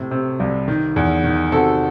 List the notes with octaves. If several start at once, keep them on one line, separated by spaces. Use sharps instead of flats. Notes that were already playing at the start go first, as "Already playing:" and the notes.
Already playing: A2 C3
C3
C2
D#3
E2
D#3
C3 F#4 A4